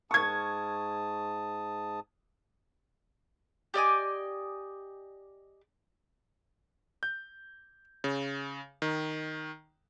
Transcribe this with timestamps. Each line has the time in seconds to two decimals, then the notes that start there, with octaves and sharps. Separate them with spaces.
0.11 G#2 A5 C#6 D#6 G#6
3.74 G4 D5 D#5 G#5
7.03 G6
8.04 C#3
8.82 D#3